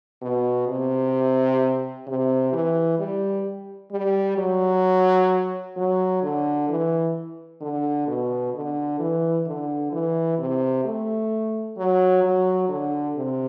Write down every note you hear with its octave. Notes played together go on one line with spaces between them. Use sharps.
B2
C3
C3
E3
G3
G3
F#3
F#3
D3
E3
D3
B2
D3
E3
D3
E3
C3
A3
F#3
F#3
D3
C3